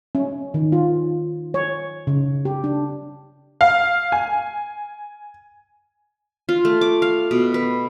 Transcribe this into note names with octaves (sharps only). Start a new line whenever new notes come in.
C#4
D#3
F4
C#5
C#3
G4
D4
F5
G#5
F4
A3
D6
F5
B2
B4